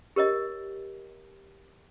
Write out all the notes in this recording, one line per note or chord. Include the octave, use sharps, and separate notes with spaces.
G4 A#4 C#5 D#5